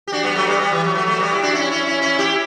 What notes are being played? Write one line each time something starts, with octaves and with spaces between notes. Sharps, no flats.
G4
D4 F#4
G3 B3
F#3 A3
G3 B3
G3 B3
E3
F#3
F#3 A3
F#3 A3
G3 B3
E4
D4 F#4
C#4 E4
C#4 E4
C#4 E4
C#4 E4
E4 G4